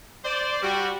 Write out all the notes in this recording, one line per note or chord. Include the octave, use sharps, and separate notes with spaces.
C5 D5
G3 F#4